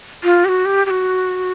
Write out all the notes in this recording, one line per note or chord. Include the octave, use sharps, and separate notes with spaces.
F4
G4
F#4
G4
G4
F#4